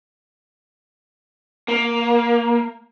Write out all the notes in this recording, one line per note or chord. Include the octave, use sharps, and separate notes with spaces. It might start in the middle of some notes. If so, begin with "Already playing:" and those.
A#3